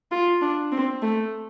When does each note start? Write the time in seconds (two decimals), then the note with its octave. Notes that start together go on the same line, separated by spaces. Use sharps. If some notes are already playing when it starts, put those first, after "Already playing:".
0.11 F4
0.41 D4
0.72 C4
1.02 A3